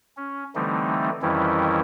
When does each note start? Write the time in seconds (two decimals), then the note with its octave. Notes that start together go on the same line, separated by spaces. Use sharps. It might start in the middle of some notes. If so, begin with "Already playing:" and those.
0.17 C#4
0.55 D3 E3 G3 A3 C4 D#4
1.22 F2 D#3 E3 G3 C#4 E4